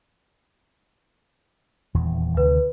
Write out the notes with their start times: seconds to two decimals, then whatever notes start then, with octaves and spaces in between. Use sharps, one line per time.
1.94 D#1 E2 E3
2.37 D2 C3 D#3 B4